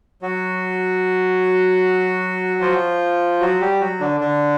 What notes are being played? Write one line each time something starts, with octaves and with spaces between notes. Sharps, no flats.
F#3 F#4
F3 F4
F#3 F#4
G3 G4
F#3 F#4
D3 D4
D3 D4